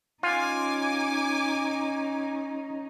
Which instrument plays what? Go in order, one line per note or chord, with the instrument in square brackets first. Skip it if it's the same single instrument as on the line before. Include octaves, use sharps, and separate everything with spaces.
[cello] C#4 D#4 [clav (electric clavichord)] F4 [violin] G#5 D6